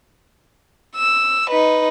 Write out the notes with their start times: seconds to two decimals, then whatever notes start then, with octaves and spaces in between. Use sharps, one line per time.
0.96 E6
1.50 D#4 B4